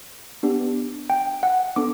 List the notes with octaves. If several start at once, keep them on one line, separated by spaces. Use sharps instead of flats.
B3 D4 G4
G5
F#5
B3 D4 A4 D6